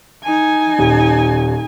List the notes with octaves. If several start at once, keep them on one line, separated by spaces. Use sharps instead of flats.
D#4 G#5
D#1